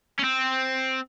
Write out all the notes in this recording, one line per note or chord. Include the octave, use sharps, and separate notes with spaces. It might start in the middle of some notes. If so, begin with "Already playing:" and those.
C#4
C4